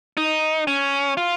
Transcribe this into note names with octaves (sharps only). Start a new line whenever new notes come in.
D#4
C#4
F4